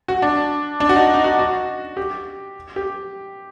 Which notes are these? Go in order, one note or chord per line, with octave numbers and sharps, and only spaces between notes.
F#4
D4
D4
F#4
D#4
D#4
F#4
F#4
G4
G4